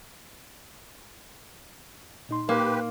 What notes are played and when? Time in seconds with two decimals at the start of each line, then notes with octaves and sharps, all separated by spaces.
2.29 A#2 D#4 C6
2.49 A#3 G4 B4